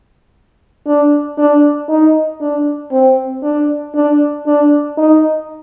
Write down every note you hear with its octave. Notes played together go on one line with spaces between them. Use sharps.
D4
D4
D#4
D4
C4
D4
D4
D4
D#4